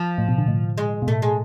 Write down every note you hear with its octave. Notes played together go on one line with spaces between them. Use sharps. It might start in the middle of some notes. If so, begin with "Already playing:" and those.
Already playing: F3
A2
B2
D3
A2
G#3
B2
A2 A3
G#3